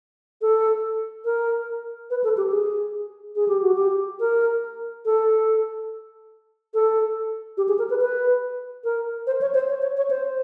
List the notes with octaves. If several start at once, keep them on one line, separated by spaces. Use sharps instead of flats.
A4
A#4
B4
A4
G4
G#4
G#4
G4
F#4
G4
A#4
A4
A4
G4
G#4
A#4
B4
B4
A#4
C5
C#5
C5
C#5
C#5
C#5
C5